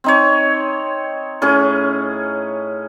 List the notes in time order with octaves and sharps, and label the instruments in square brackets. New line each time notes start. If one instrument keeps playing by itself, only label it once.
[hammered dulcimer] C4 D#4 C#5
A2 C#4 G#4